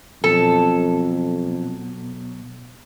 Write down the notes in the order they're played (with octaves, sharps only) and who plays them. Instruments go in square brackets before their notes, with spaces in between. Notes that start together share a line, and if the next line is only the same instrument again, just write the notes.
[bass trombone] F2 [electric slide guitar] B2 F#3 [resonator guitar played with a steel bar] A4